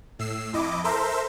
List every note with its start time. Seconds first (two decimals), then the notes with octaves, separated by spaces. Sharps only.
0.19 A2 E6 C7
0.53 F2 E4 D#5 D6
0.84 A4 A#4 C5 E5 A#5